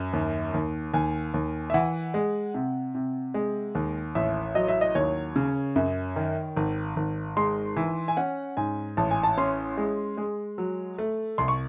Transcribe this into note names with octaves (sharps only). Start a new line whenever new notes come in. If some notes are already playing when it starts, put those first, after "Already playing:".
Already playing: F#2
D#2
D#2
D#2 G#5
D#2
E5
E3 F#5
G#3
C3
C3
G#3
D#2
A1 E5
F#3 D#5
E5
D#5
D#2 C#5
C#3
F#2
D#3
G#1
G#1
G#3 C6
E3
G#5
C#4 F#5
G#2 G#5
A1 A5
G#5
A5
C#4 C6
G#3
G#3
F#3
A3
C2 C6
C#6